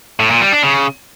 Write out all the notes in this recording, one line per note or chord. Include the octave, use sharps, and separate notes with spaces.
A2
A#2
G3
D4
C#3